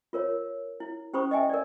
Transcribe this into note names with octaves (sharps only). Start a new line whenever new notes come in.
F4 A#4 C#5
E4
C#4 G4 C5 B5 C#6 D#6
D#5 E5 G5 G#5
A#4 D5